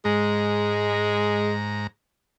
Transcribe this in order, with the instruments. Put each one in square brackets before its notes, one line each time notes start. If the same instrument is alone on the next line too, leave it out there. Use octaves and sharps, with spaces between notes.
[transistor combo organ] G#2 A#5 [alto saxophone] G#3